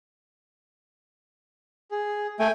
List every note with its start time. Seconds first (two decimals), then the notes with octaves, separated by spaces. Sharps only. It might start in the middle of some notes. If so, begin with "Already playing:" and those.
1.91 G#4
2.40 A3 G5 G#5